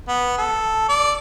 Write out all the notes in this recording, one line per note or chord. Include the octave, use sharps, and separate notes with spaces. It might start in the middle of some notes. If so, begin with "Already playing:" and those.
B3
A4
D5